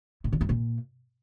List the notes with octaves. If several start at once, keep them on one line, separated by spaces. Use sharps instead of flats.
A2
D3
G2
A#2